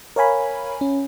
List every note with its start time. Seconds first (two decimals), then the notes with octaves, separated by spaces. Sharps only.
0.16 A#4 C#5 F5 G#5 B5
0.81 C#4